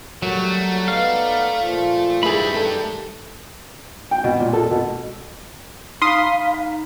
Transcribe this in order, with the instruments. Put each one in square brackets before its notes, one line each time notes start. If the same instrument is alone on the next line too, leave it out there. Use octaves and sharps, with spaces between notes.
[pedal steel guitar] F#3 [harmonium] G3 F#4 A#4 [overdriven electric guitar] A3
[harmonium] B3 D#4 D5 [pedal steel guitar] F5
[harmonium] A#2 F3 F4
[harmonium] D#3 G4 [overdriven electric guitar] G3 B4 [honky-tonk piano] E4 G#4 [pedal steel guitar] B5
[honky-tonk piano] A3 A4
[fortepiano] G5
B2
A#2
A4
B2
[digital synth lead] D#4 [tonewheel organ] F5 B5 [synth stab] C6 D#6